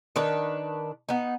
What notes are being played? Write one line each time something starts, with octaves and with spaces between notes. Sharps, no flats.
D#3 D4 B4
B3 D#4